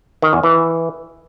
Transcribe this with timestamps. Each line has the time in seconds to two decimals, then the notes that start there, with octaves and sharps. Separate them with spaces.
0.22 D#3
0.33 E2
0.43 E3